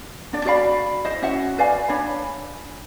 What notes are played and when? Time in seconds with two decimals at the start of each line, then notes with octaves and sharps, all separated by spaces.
0.33 D4 D5
0.45 F#4 D5 F5 B5
1.05 E4 C5 D#5
1.22 C#4 F#4 E5 F#5
1.58 B4 D5 F5 G#5
1.88 D4 C#5 B5